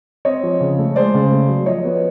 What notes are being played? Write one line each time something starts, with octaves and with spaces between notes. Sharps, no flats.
C4 C#5 D#5
F3
C#3
A3
G#3 C5 D5
C#3
A3
F#3
F3 C#5 D#5
B3